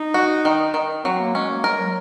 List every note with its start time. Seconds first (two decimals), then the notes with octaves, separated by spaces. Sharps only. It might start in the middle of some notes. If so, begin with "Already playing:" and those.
Already playing: D#4
0.14 F#4
0.45 D#3
0.74 D#3
1.04 F#3 C4
1.14 C4
1.19 A#3
1.35 G#3 C#4
1.50 A#3
1.64 G#3 A#4
1.80 F#3